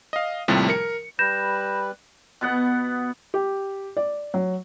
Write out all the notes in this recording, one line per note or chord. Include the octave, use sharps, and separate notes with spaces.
D#5 F5
D#2 A2 C3 F3 G3
A#4 C#7
G3 B4 G6 A#6 E7
B2 B3 F#5
G4
D5
F#3